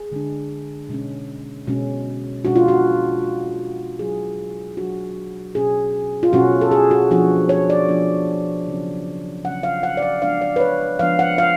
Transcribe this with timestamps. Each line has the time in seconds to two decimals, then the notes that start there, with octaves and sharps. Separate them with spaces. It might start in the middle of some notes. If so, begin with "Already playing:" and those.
Already playing: G#4
0.12 D3 G#3 D4
0.89 B2 G#3 C#4
1.67 B2 G#3 C#4
2.45 B2 G#3 D4 F#4
2.56 F4
2.68 F#4
3.22 B2 G#3 D4
3.99 F#3 A3 D4 G#4
4.77 F#3 A3 D4 F#4
5.55 B2 A3 C#4 G#4
6.23 F4
6.33 B2 A3 C#4 F#4
6.61 A4
6.71 G#4
6.91 F#4
7.11 F3 B3 D4 F#4
7.49 C#5
7.70 D5
7.89 F3 B3 D4
8.67 C#3 F#3 C#4
9.44 C#3 F#3 C#4 F#5
9.63 F5
9.83 F#5
9.97 D5
10.02 F5
10.22 F3 G#3 B3 D4 F5
10.41 D5
10.56 B4
10.60 C#5
10.99 F3 G#3 B3 D4 F5
11.19 F#5
11.38 F5